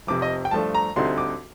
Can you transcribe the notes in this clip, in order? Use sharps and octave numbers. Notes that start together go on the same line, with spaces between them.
F1 F2 C3 D6
D#5
G5
G2 F3 A3 D4 A5
A#5
D2 D3 G3 C4 D#4 C6
D6